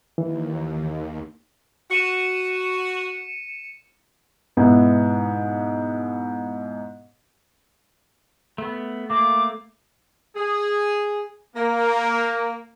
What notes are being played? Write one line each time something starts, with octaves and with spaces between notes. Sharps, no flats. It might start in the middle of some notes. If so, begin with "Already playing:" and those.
D#2 E3
F#4 C#7 D#7 E7
G#2 B2 B3 E4
A3 B3
A3 A#3 D6
G#4
A#3